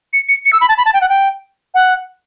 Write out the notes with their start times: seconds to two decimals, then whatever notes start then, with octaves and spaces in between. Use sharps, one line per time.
0.13 C#7
0.28 C#7
0.45 C#7
0.53 E6
0.61 B5
0.69 A5
0.77 B5
0.85 A5
0.94 G5
1.01 F#5
1.09 G5
1.74 F#5